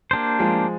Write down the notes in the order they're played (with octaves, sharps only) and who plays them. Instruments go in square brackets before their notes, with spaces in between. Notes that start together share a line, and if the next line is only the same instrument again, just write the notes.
[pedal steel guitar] A#3 D4 G4 C5
[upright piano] F3 G#3